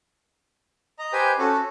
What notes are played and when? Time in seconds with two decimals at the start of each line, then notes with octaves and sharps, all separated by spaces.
0.99 D#5 A#5
1.13 G4 B4 C5 G5 G#5
1.38 C#4 F#4 A4